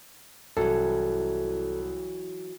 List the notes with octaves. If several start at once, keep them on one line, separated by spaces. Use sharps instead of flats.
C2 E3 F#3 A4